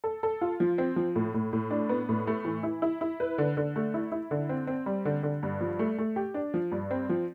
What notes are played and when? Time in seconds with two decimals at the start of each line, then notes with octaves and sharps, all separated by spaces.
0.04 A4
0.23 A4
0.41 F4
0.60 F3
0.78 C4
0.96 F3
1.16 A2
1.34 A2
1.53 A2
1.71 D4
1.89 B3
2.09 A2
2.27 A3
2.45 E3
2.63 E4
2.82 E4
3.01 E4
3.20 B4
3.38 D3
3.57 D3
3.76 A3
3.94 E4
4.12 E4
4.31 D3
4.49 C4
4.67 C4
4.86 G3
5.05 D3
5.23 D3
5.43 G2
5.61 F3
5.79 A3
5.98 A3
6.16 G4
6.34 D4
6.54 F3
6.72 G2
6.91 C4
7.09 F3